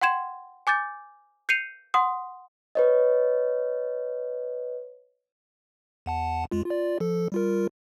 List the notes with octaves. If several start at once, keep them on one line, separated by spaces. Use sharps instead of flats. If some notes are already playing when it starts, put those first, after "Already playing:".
F#5 G5 C6 G#6 E7
G#5 D6 G6 A6
G6 C7 C#7 D#7 F7
F#5 C6 D#6
B4 C#5 D#5
E2 F#5 A5
F2 G#3 F4
F4 D5
F3 A4
G3 F4 A#4